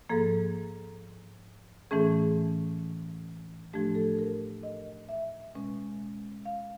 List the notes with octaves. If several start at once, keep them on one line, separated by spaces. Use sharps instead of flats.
G#2 F3 A#3 A4
A2 E3 A3 C#4 G#4
A2 F3 A3 D4 G4
A4
A#4
D#5
E5
B2 G#3 C#4
F5